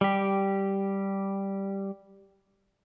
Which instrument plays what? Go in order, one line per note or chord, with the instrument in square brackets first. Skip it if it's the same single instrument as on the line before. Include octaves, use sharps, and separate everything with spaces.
[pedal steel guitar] G3 G4